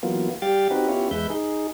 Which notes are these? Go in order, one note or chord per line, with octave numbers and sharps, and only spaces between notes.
E3 F#3 A#3 B3 F4
G3 G4 F5 G5 A6
C4 D#4 F#4 G4 B4
B3 C#4 E4 F4 G4 C#5
E2 G#3 B4 E5 G6
D#4 G#4